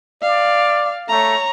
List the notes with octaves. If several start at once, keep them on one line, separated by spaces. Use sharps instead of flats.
D5 F5
A3 C#5 A#5